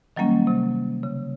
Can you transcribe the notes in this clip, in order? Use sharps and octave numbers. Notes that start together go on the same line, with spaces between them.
D#3 F#3 G3 A#3 C#4
C3
C#3